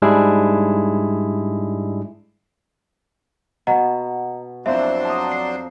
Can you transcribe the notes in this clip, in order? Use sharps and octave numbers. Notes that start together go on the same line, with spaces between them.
G#2 G3 G#3 D4 E4 G#4
B2 D#5 F#5 A#5
F2 F#3 C4 D4 E4 C5 E5
A5 A#5 D#6
C7